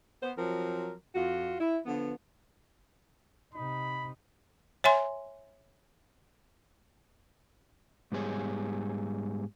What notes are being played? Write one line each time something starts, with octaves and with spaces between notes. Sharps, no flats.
B3 C5
F3 F#3 C4 A#4
F2 F4 F#4
E4
D3 F3 B3
C3 D#4 B5
C#5 E5 G#5 C6
G#2 G3 B3 G#4 C#5